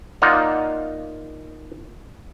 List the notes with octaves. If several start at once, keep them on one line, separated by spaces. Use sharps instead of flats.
A#3 D#4 F4 D5 F5 F#5